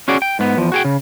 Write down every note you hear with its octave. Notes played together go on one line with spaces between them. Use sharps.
C#4 F#4 G#4 D5
G5
G#2 B3
E2 F3
F#4 G#4 G5
C#3